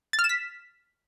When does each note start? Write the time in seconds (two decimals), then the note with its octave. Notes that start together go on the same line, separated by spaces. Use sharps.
0.13 A6
0.19 F6
0.24 E7
0.29 B6